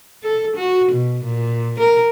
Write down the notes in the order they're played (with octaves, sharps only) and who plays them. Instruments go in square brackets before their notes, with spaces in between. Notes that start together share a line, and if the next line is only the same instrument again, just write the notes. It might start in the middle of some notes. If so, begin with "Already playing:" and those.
[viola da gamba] A4
F#4
B2
A#2
A#4